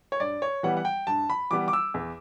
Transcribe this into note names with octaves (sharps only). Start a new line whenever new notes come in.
C#5
G2 D5
C#5
E3 G3 B3 F#5
F#5
G5
G2 A5
B5
E3 G3 B3 D6
D6
E6
E2